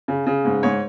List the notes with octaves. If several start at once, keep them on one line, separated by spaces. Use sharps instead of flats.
C#3
C#3
G#2
G#2 C#5